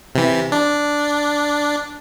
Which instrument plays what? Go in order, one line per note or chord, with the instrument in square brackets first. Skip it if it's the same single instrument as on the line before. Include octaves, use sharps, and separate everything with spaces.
[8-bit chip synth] C3 E3
D4